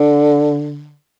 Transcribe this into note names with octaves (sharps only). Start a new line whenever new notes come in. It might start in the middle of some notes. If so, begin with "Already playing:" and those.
Already playing: D3